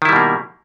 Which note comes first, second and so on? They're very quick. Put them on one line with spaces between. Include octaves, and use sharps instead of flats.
D#3 E4 G3 B2 A#3